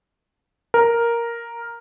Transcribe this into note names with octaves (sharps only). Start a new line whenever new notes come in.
A#4